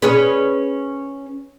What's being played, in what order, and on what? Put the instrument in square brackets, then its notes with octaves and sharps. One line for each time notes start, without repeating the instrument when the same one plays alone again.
[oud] C#4 G#4 B4